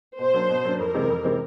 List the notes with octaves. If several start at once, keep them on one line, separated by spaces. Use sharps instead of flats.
B2 C5
F#3 A#3 D4
B2
F#3 A#3 D4
F2 A#4
C3 E3 G#3 C4
F2
C3 E3 G#3 C4